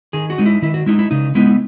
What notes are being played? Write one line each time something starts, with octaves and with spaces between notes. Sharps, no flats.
D#3 G#4
F#4
G#3 D#4
E4
D#3 E4
F#4
G#3 D#4 E4
E4
C#3 D#4
G#3 B3 D#4 E4